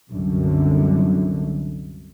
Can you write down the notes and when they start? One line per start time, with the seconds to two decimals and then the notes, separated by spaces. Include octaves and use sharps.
0.12 C2 F#2 D3